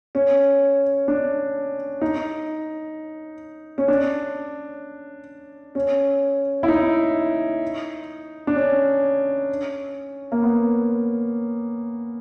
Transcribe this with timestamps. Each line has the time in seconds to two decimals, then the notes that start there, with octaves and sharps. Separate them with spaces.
0.15 C#4
1.08 D4
2.01 D#4
3.78 C#4
3.88 D4
5.75 C#4
6.63 E4
6.68 D#4
8.47 D4
8.56 C#4
10.32 A#3
10.43 B3